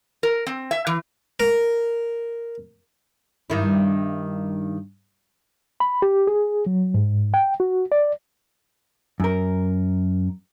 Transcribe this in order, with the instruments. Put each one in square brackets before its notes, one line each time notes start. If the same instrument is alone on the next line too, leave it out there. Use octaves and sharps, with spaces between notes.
[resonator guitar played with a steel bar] A#4
C4
E5
E3
[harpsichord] A#4
[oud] G2 D#3 E4
[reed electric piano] B5
G4
G#4
F#3
G#2
G5
F#4
D5
[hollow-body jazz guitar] F#2 A#4